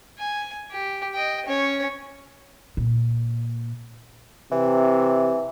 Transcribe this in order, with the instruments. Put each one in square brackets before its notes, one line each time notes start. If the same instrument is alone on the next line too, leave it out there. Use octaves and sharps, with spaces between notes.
[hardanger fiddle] G#5
G4
D#5 G5
C#4 C#5
[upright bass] A#2
[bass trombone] C3 [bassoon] E3